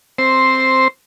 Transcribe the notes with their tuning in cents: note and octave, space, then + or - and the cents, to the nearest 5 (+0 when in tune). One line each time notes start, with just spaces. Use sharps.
C4 +5 C5 +0